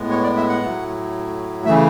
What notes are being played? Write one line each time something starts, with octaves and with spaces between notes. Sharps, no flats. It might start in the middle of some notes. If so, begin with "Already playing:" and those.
Already playing: A2 G#3 B3
C#5
D5
E5
F#5
A2 F#3 A3
C#3 E3 A3 E5